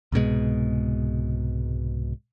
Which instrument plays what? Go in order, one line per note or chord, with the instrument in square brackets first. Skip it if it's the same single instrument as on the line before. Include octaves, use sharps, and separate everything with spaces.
[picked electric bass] C2 G#2 B2 G#3